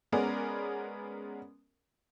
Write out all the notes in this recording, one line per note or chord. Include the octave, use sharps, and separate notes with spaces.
G#3 B3 C#4 G#4 A#4 D5